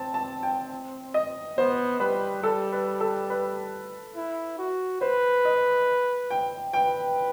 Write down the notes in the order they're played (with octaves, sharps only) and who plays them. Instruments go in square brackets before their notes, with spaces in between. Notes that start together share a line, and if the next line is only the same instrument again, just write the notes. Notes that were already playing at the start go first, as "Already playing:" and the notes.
Already playing: [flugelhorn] C4 [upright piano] A5
[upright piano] A5
G5
D#5
[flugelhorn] B3 [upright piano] C5
[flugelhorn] G3 [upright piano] B4
[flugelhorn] G3 [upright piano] A4
[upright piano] B4
A4
B4
[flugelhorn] E4
F#4
[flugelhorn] B4 [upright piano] C5
[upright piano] D#5
G5
[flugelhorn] B4 [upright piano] G5